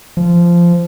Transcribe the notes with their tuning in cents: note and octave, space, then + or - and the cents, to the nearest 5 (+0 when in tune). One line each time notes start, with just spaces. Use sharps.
F3 -15